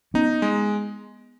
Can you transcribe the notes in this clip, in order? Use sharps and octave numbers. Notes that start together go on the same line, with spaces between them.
B3 C#4 D#4
G#3